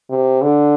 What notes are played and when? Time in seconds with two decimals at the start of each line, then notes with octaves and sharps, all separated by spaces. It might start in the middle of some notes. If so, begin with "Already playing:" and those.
0.10 C3
0.42 D3